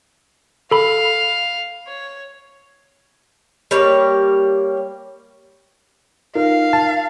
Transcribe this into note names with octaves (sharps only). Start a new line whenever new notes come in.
A4 F5 B5
C#5
G3 A#3 C#5
D#4 F4 A#4 F5
A5